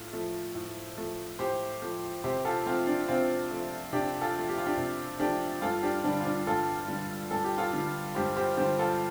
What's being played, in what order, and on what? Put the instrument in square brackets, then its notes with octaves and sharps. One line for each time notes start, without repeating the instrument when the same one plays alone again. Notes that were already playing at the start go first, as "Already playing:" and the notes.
Already playing: [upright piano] A2 A3 F4
F3 A3
A2
F3 A3
A2 G4 C5
F3 A3
C3 G4 C5
F4 A4
F3 A3 C4 F4
D4
C3 C4 F4
F3 A3
C3 D4 G4
F4 A4
F3 A3
G4
F4
D4 G4
C3
F3 A3 D4 G4
G2 F4 A4
D4 G4
D3 G3 D4
F4
D4
G2 F4 A4
D3 G3
G2 A4
G4
F4 A4
D3 G3
G2 G4 C5
G4 C5
D3 G3 G4 C5
F4 A4